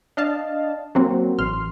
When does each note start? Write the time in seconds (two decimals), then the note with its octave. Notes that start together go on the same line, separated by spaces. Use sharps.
0.17 D4 D#5 F5 A5
0.95 F#3 A#3 C4 F#4
1.39 A1 C6 F6